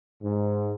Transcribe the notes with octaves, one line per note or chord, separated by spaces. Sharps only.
G#2